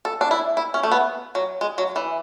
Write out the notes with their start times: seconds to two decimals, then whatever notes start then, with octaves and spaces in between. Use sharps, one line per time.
0.05 A4
0.21 D4
0.31 E4
0.57 E4
0.74 C#4
0.83 A3
0.92 B3
1.35 F#3
1.61 G#3
1.78 F#3
1.96 E3